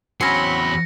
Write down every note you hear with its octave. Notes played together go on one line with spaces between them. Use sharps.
E2 F#3 C4 C#4 B5 C6 A#6 C#7